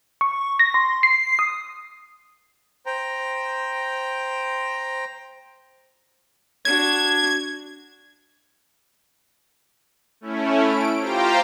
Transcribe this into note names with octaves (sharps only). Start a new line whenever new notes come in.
C#6
A#6
C6
C7
D#6
C5 G5 A#5
D4 F#4 G#6
A3 C#4 E4
D7
F4 G4 C5 F5 G5 A#5